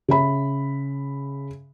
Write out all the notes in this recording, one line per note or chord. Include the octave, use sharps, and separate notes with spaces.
C#3 E5 B5